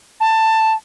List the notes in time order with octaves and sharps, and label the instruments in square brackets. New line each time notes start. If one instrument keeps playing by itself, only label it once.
[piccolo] A5